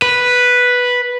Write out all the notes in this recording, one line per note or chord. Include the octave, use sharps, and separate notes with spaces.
B4